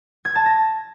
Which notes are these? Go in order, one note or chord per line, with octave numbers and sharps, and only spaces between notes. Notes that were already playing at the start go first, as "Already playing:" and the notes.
G#6
A5
A#6